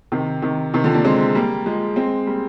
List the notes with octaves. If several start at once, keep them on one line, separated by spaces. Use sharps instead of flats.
C3 D#3
C3 D#3
C3 D#3
D3 F3
A#3 D4
G#3 C4
G3 A#3
F3 G#3
G#3 C4
G3 A#3